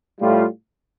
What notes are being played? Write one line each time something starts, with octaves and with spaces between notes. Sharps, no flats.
A2 G3 F4